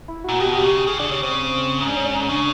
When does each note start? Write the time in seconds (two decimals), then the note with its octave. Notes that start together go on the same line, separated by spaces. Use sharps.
0.08 E4
0.24 A#2 F#4
0.40 B2 G4
0.48 F#4
0.56 D3 G4
0.64 C#3
0.87 C#3 G#4
0.99 D3 D4
1.11 C#3 C#4
1.22 C#3 C4
1.81 G#2 C#4
1.89 D4
1.96 C#4
2.05 D4
2.12 C#4
2.29 C#3 D4